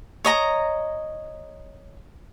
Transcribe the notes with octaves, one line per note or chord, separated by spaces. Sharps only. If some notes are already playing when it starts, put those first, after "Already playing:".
C#5 D#5 A#5